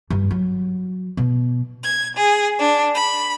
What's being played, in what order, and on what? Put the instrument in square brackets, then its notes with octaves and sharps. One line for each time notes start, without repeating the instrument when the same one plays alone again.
[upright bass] G2
F#3
B2
[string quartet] G#6
G#4
D4
B5